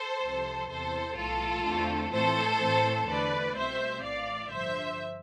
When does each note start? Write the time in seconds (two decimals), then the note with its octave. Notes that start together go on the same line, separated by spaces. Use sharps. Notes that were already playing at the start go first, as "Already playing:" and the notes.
Already playing: A4 C5
0.22 C2 C3 F3
0.70 E2 C3 E3 A4 C5
1.17 B1 A2 E3 F4 A4
1.65 E2 D3 A3 C4
2.13 A2 E3 A3 C4 A4 C5
2.61 A2 E3 A3 C4
3.08 E2 D3 A3 B4 D5
3.56 C2 B2 A3 C4 C5 E5
4.04 A1 A2 E3 D5 F5
4.51 G2 D3 F3 C5 E5